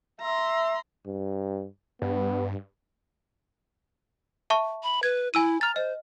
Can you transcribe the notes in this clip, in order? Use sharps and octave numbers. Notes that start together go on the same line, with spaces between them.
E5 A#5 C6
G2
G2 B3
E5 A5 C#6
B5
B4 G#6
E4 G#5 E6 D#7
A#5 F6 A6
C5 D#5